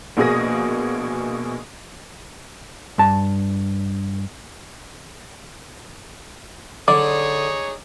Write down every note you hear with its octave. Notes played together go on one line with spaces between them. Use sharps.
A#1 B2 A#3 G#4 D#6 A#6
G2 A5
D3 D#4 G#4 C#5 D5 D6